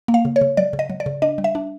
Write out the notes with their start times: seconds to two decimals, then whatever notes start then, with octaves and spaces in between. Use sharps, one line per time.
0.08 A#3
0.14 F5
0.25 C#3
0.36 C#5
0.41 C#3
0.57 F#3 D5
0.73 C#3
0.79 D#5
0.90 F#3
1.00 D5
1.06 C#3
1.22 D4 D#5
1.38 G3
1.44 E5
1.55 D4